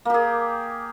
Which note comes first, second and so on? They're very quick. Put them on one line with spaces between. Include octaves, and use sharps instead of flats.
A#3 G4 G#4